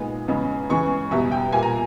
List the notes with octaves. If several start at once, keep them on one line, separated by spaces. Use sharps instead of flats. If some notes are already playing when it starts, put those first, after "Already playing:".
Already playing: A#2 G#3 B3 D#4
E2 C#3 G#3 B3
C#3 E3 G#3 C#6
E2 B2 G3 B3 E5
G5
A#2 G3 A#3 G#5
A#5